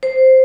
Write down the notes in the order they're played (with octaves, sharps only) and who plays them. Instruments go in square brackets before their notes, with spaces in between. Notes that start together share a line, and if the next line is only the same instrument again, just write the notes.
[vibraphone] C5